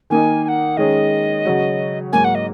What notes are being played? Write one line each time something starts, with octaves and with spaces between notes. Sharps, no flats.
D#3 A#3 D#4 G#5
G#5
F#5
D#3 G#3 C#4 G#4 D#5
C#3 F#3 C#4 F#4
G#2 F#3 A#3 F#4 G#5
F#5
D#5